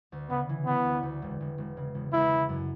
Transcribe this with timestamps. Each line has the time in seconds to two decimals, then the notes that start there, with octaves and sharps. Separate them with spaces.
0.12 D2
0.30 C#3 B3
0.49 E3
0.67 C#3 B3
0.85 D2
1.03 D2
1.22 E1
1.40 E1
1.58 E1
1.77 C#3
1.95 E1
2.12 E1 E4
2.32 E3
2.49 F#2